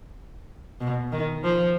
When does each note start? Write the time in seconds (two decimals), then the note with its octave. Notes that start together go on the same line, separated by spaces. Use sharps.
0.81 B2
1.12 D#3
1.44 F3